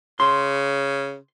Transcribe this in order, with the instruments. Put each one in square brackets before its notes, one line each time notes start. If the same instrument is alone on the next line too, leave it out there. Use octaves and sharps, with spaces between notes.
[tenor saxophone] C#3 [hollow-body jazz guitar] C6